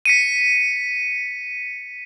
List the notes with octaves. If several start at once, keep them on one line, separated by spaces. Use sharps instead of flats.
B6 C#7 D#7